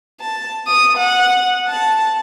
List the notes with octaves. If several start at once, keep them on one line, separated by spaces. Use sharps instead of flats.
A5
D#6
F#5
A5